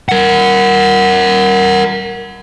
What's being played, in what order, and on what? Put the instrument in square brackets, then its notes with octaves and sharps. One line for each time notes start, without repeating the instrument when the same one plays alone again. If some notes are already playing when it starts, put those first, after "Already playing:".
[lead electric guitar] A#4 F#5